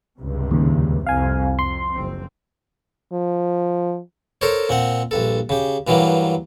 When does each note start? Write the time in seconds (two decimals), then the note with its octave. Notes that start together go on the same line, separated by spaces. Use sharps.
0.19 C#2 G2 C3
0.51 D#2 C#3
1.07 C2 F2 F5 G#5
1.59 F2 C6
1.93 F#1 C4
3.12 F3
4.41 A4 A#4 C5 C#5
4.69 A#2 C4 F#5
5.11 A#1 G2 A4
5.49 C#3 G4
5.87 G2 E3 F#3 G3 A#3